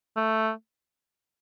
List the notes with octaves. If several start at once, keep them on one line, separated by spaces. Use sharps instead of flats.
A3